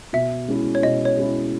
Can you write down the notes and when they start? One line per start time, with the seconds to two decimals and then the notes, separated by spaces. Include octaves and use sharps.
0.13 B2 E5
0.48 G#3 C#4 E4
0.75 C#5
0.83 B2 D#5
1.05 C#5
1.18 G#3 C#4 E4